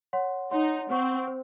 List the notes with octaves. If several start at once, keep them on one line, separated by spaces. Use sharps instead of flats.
C#5 F#5 C6
D#4 C#5 F#5 C6
C4 C5 F#5 C#6
C5